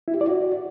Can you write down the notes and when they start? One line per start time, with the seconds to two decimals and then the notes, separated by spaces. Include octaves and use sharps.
0.08 E4
0.14 G4
0.21 D5
0.28 F#4